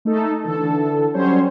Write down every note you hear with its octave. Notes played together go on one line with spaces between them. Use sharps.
A3 D#4 A4
D3 E3 A4
F#3 G3 C#4 C5 C#5